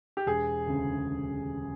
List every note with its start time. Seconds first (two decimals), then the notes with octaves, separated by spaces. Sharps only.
0.17 G4
0.26 E1 G#4
0.67 D2 C#3